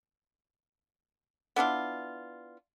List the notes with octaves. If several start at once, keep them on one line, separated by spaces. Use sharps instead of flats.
B3 D4 E4 F4